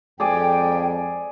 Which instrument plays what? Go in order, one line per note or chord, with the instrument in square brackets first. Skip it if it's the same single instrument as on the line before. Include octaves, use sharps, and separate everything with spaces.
[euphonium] F2 [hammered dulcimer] G#4 D5 G#5 [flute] G5